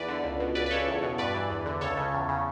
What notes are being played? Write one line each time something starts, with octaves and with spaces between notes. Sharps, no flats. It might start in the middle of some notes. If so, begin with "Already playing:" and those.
Already playing: E2 B4 D5
D3
C#2
B2
C#2 B4 D5
B4
C#3 A4 C#5
E2
B2
G2 B4 D5
E3
E2
D3
C#2 A4 C#5
C#3
E2
C#3